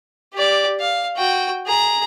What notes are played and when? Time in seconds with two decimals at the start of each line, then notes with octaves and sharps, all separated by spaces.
0.33 G4 D5
0.80 F5
1.17 F#4 G5
1.66 G#4 A#5